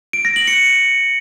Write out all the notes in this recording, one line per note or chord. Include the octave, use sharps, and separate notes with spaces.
D7
A#6
F#7
C#7